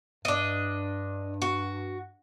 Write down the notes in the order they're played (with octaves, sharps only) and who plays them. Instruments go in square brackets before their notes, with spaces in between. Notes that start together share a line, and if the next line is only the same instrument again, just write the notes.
[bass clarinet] G2 [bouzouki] D4 D#5
[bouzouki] F#4